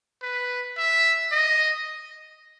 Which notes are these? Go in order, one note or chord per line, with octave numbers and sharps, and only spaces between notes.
B4
E5
D#5